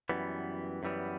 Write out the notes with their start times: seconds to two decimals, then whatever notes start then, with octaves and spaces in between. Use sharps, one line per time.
0.09 F#2 E3 G3 B3
0.83 F#2 E3 G3 B3